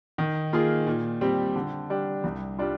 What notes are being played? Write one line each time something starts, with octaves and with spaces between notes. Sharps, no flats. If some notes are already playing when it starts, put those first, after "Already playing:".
D#3
A#3 F4 G#4
A#2
G3 C4 G4
D3
G3 D4 G4
C2
G3 D4 F4